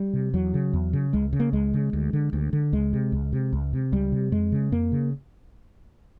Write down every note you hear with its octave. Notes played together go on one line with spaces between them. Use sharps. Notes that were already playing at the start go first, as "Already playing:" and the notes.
Already playing: G3
C3
E2 F#3
C#3
E2
C#3
C#2 G#3
C#3
A#3
C#2 G#3
C#3
D2
D3
D2
D3
C#2 G#3
C3
C#2
C3
C#2
C3
C#2 G3
C3
F2 G#3
C#3
F2 A#3
C#3